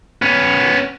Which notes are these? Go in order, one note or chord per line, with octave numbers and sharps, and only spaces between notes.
B3 C#4